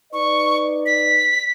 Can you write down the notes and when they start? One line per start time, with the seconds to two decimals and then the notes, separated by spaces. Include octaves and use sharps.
0.13 D#4 B4 D5 C#6
0.86 B6